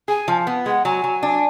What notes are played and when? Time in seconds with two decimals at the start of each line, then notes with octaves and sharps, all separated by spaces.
0.08 G#4 G#5
0.28 F3
0.47 B3
0.66 G#3 F#5
0.85 F#3 G#5
1.04 F#3
1.23 D4